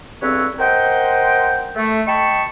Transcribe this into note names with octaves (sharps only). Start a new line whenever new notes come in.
E2 G2 C4 A4 B4 C#5
A#4 C5 D#5 F#5 G5
A3
D#5 G5 A5 B5 C#6